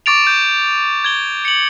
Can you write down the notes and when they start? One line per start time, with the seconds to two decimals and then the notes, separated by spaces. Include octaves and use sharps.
0.06 C#6 D6 A6 D7 F7
0.27 G6
1.04 G#6 G7
1.45 C#7 F#7